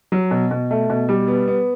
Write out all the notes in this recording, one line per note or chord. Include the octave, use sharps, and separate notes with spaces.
F#3
B2
B2
A3
B2
G3
B3
B3